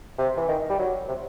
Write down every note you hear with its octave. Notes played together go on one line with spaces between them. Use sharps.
C3
E3
D#3
G3
F#3
C3